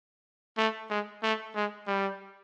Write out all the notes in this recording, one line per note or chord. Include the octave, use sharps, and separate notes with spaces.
A3
G#3
A3
G#3
G3